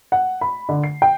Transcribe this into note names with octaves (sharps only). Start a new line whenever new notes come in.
F#5
B5
D3
C7
G5